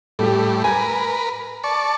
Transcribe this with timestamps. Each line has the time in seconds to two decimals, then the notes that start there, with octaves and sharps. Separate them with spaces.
0.19 A2 G3 A3 G4
0.64 A#4 B4 G#5
1.64 D5 A5 C#6